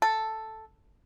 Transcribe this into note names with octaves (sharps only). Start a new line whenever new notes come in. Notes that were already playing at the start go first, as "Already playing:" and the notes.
A4